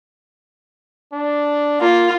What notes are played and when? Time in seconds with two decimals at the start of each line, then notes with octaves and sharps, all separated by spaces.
1.13 D4
1.81 A#3 F4